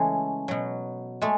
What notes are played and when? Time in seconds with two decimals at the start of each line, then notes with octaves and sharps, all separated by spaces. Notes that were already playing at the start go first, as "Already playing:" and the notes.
Already playing: C#3 E3 G#3 A3
0.48 B2 F#3
1.21 G#3 A3